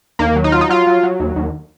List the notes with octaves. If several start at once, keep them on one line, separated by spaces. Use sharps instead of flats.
D#2 A#3
F#3
D#4
F#3 F4
D#4
F#3 F4
F#3
F#3
D#2
D#2